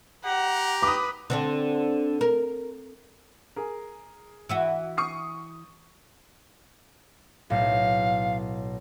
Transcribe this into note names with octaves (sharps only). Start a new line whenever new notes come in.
G4 F#5 A#5
B4 D6 D#6
D3 C4 D4
A#4
G#4 A#4
E3 E4 F#4
C#6 D#6 C7
B1 A2 F5